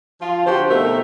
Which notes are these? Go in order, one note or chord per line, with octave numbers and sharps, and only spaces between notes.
F3 F4
D3 F#4 G4 C5
B2 D#3 A3 C4 A#4